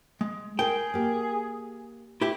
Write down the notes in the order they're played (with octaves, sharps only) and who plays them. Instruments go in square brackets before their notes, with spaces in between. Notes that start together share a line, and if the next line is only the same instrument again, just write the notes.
[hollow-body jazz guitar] G#3
[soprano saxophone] G#4 [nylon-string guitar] A#4 [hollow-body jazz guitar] G5
[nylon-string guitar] A#3 G4
[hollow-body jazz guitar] E4 G4